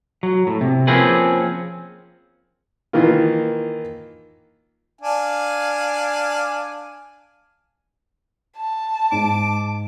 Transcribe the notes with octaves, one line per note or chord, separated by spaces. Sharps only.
F#3
A2
C3
F3 A#3 C4 C#4 G#4 B4
D#3 E3 A#3 F4
D4 F5 G#5
A5
G#2 D6